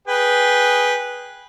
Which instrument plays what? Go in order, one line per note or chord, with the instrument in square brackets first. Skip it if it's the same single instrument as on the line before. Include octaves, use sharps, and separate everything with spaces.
[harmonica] G#4 B4 G5